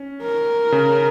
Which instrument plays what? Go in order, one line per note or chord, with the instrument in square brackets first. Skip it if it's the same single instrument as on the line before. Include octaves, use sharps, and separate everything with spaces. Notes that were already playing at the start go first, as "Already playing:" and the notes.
Already playing: [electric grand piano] C#4
[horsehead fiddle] A#4
[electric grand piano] C#3